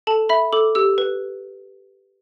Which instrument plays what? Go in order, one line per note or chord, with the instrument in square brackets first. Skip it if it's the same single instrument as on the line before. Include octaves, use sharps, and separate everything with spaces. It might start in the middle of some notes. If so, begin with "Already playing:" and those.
[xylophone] A4 A5
E5 B5
A4 D6
G4 E6
B4